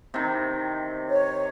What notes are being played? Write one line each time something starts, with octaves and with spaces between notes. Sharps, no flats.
C3 D#3
C#5